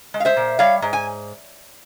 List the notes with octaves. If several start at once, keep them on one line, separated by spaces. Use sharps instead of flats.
G#3
F5
C5 E5
A#2
G3 C#5 F5
G#2
G#5